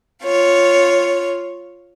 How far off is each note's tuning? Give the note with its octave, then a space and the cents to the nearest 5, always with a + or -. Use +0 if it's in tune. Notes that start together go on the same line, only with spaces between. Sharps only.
F4 +0 C#5 +0